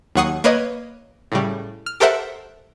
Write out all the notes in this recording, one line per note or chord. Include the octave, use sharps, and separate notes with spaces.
D#2 F#3 F#5 C#6 D#6 C7
A#3 B4 C#5 D#5
A2 C#3 G3
F6
G4 A4 A#4 C5 E5 F#5